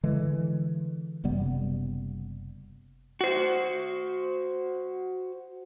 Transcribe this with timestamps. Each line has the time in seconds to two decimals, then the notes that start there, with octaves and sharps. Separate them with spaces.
0.03 D3 E3 G#3
1.24 F#1 C3 G3 B3
3.21 F#4 C5